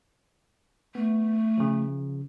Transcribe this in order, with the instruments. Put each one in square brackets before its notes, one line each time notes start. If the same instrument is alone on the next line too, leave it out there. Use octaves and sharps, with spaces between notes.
[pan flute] A3 [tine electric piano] B3
[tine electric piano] C#3 F3